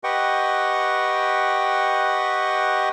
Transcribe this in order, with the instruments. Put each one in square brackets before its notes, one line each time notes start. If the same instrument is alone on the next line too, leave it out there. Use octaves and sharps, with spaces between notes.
[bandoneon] G4 B4 D#5 F#5 G5 C#6